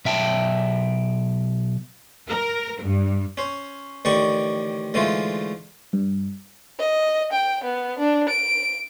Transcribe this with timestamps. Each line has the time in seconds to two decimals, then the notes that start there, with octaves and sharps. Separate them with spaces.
0.05 B1 E5 G5 A5
2.27 A#4
2.82 G2
3.37 C#4 C5
4.05 A1 D3 D#3 D5 G5 C#6
4.94 G#2 D3 E3 G#3 A3 F4
5.93 G2
6.79 D#5
7.33 G5
7.64 B3
7.98 D4
8.29 D7